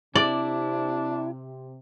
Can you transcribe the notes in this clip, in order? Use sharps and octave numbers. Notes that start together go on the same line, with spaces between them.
C3 D4 E4 D5